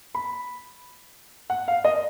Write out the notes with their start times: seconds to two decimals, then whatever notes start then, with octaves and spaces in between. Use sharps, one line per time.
0.15 B5
1.50 F#5
1.68 F5
1.84 D#5